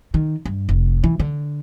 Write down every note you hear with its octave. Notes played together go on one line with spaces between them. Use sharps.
D#3
G2
F1
E3
D3